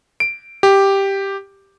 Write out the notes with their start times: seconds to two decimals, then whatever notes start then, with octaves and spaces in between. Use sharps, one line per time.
0.20 D7
0.63 G4